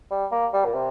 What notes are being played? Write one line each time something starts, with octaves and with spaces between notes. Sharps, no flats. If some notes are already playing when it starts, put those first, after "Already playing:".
G3
A#3
G3
A#2
C3